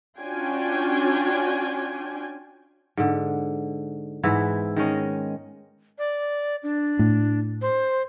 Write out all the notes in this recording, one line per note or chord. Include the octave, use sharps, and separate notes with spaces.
C#4 D4 F4 F#4 G5 G#5
G#2 D3
G#2 E3 B3 E4
D#3 G#3 C#4 D#5
D5
D4
A2
C5